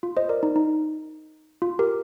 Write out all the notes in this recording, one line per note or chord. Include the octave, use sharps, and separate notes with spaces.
F4
C5 D#5
A#4 D5
D#4
D#4
F4
G4 A#4